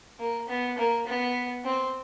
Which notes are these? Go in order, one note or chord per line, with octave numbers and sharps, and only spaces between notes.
A#3
B3
A#3
B3
C4